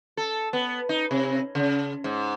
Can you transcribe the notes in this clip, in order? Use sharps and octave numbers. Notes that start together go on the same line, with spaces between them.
A4
B3
D#4
C3
C#3
G#2